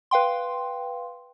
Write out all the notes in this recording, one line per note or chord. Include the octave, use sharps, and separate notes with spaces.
B4 F5 G5 C6